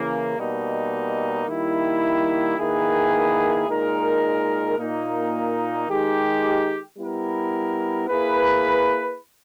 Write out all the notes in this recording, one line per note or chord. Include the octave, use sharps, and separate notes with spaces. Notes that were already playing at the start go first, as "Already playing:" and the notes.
Already playing: C#3 E3 A#3
B2 G3 A#3 D#4
D#3 G3 A#3 E4
D#3 A#3 E4 G#4 B4
A#2 G#3 D#4 A#4
A#2 A#3 D#4
D#3 G#3 D#4 G4
G3 B3 E4 A#4
A#3 E4 G#4 B4